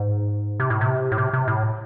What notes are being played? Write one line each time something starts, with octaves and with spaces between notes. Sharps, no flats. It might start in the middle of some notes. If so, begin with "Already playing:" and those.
Already playing: G#2
C3
A2
C3
A2
C3
C3
A2